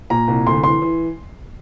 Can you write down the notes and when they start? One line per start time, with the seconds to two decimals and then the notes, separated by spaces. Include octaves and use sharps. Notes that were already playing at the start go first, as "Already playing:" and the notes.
0.10 A#2 A#5
0.28 C2
0.46 D2 C6
0.63 E3 C6
0.82 E3